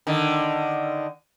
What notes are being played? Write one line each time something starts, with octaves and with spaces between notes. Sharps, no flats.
D3 D#3